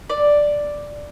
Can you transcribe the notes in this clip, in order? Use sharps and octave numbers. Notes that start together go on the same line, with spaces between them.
D5